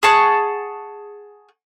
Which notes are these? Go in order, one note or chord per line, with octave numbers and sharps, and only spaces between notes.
G#4 F#5 A5 C#6